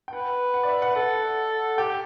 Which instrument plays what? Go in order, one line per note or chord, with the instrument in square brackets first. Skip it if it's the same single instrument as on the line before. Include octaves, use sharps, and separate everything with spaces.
[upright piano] G5
[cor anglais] B4 [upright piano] F#5
[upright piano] F#5
D5
E5
F#5
[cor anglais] A4 [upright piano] F#5
[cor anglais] G4 [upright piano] G5